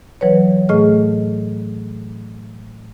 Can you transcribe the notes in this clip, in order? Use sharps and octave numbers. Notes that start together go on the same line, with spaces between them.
E3 F#3 B4 C#5
A2 A3 G#4 D#5 F6